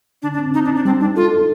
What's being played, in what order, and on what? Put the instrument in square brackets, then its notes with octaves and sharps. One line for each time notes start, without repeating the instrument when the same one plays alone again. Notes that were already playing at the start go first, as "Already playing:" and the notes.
[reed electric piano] D3 [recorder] D4
[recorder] D4
[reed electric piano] C4
[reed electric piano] C4 [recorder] D#4
[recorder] D4
[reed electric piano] C4
[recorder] D4
[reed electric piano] G3 [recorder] C4
[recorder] D4 [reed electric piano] D#4
[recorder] F4 [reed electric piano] A4
[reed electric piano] A4